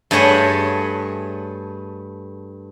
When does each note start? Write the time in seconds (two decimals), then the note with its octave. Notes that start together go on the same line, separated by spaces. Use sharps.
0.11 G2 A3 G#4 C#5 F#5 G#5